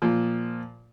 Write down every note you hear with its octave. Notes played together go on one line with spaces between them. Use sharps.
A#2 F3